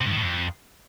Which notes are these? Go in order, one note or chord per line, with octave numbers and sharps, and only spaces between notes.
C3
G2
D#3
A2
F2